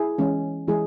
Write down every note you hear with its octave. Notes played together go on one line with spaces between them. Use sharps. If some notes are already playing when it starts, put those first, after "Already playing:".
Already playing: E4 G#4
E3 G#3 C#4
E3 G#3 E4 G#4